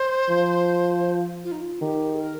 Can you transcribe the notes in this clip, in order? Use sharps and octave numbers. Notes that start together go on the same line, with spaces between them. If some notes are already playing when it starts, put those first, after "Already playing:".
Already playing: C5
F3
F4
D#4
F4
D#3 G4
A#4